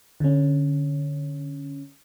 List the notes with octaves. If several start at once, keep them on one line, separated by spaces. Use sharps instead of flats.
D3 C#4